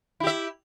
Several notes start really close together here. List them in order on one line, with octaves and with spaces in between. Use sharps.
E4 G4 E5